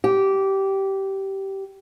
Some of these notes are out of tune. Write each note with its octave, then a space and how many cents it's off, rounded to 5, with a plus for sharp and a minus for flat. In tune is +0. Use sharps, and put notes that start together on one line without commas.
G4 -15